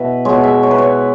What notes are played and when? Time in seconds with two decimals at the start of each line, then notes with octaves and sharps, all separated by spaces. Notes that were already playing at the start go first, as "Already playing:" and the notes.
Already playing: B2 E4 B4 E5
0.25 B2 G#3 C#5
0.44 E5
0.63 C#5
0.71 B4
0.78 C#5